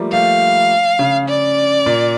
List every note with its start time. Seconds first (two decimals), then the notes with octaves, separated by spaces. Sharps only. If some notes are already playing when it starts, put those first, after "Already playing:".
Already playing: F3 G3 A3 A#3
0.12 F3 A3 F5
0.99 C#3
1.28 D5
1.86 A#2